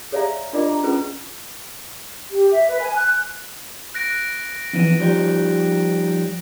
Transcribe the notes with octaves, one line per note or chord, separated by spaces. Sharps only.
G#4 C#5 D5 E5 F5 A#5
D4 F4 A#4 D5 D#5 D6
A#5
C#4 F4 G#4 B4
G4
E5
B4
G#5
F#6
F#6 A#6 D7
F2 E3
F3 G3 D#4